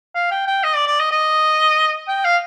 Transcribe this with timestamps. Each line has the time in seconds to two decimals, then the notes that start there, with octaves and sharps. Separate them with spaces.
0.15 F5
0.31 G5
0.47 G5
0.64 D#5
0.75 D5
0.87 D5
1.00 D#5
1.12 D#5
2.08 G5
2.25 F5